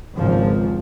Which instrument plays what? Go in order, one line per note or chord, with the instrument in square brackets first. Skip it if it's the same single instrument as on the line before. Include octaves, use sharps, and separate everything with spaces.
[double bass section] G#1 C#2 F3